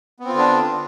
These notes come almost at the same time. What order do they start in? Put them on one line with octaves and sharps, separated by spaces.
B3 C4 F4 D3 D4